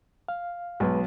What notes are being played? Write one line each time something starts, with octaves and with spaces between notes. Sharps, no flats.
F5
B1 G#3 B4